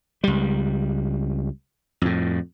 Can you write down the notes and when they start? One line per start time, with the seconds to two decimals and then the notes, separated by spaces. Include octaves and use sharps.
0.24 C#2 G3
2.02 F2 A2